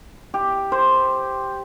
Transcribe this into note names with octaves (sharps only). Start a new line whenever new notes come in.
G4
C5